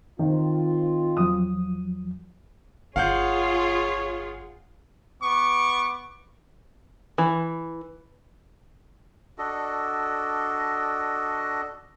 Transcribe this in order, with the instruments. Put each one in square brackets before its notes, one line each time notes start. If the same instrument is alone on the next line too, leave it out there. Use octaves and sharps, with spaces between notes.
[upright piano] D#3 [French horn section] C4 F4
[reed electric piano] E2 F3 F#3 [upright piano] D#6
[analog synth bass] G1 [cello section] F4 G#4 [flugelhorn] C#5 [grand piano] F5 F#5 G6
[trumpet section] B3 C#6 D6
[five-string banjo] E3
[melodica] D4 F#4 A4 D#5